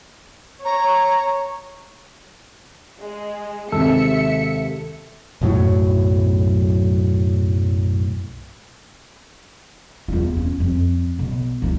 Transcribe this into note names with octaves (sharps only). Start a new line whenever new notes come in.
C#5 A#5
G#3
D#2 C3 G#3 A4 E5 C#7
B1 F#2 A2 F#3
E2 F4
C#4
F2
B1
D2 E3